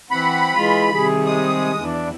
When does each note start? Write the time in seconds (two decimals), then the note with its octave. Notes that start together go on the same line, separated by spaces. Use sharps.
0.11 E3 C4 F#5 B5
0.56 E3 G#3 F4
0.92 C3 D#3 G3 G#4
1.26 G#3 D#6
1.81 E2 D4 E4